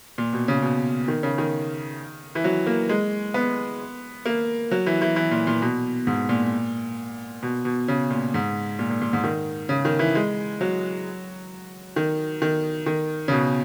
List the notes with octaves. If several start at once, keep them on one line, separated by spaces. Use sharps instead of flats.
A#2
B2
C#3
B2
D#3
C#3
D#3
E3
F#3
A#3
G#3
B3
A#3
F#3
E3
E3
E3
A#2
A#2
B2
G#2
A#2
B2
B2
C#3
A#2
G#2
A#2
A#2
A#2
G#2
D#3
C#3
D#3
E3
G#3
F#3
D#3
D#3
D#3
C#3
B2